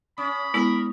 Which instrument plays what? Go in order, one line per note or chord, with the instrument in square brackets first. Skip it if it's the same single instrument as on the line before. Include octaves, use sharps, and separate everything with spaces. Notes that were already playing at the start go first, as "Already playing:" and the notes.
[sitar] C#4 [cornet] B5 [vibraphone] D#6
[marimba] G#3 B3 E4 [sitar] A#4